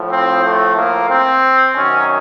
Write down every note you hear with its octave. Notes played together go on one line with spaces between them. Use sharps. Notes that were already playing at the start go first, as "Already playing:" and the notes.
Already playing: A2 F3
C4
A3
A#3
C4
F#2 D#3 F#3 C#4